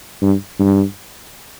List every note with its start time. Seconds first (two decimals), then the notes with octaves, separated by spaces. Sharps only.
0.22 G2
0.59 G2